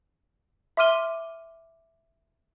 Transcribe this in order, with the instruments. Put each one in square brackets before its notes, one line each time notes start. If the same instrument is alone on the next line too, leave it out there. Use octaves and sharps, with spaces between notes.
[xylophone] E5 C6 D6 F6 D#7 G7